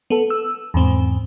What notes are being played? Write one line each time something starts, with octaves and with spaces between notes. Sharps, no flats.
B3 A4
E6
E2 G#2 C4